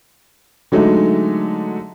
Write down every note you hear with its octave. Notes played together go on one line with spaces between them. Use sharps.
D3 F#3 G#3 A3 D#4